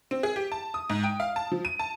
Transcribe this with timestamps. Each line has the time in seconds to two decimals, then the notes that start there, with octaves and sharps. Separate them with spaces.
0.11 C4
0.23 G#4
0.36 G4
0.52 A5
0.74 D#6
0.90 G#2
1.04 G5
1.20 F5
1.36 A5
1.52 F3
1.65 D#7
1.79 A5